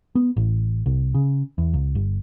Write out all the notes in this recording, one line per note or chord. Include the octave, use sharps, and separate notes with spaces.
B3
A1
C2
C#3
E2
C#2
G1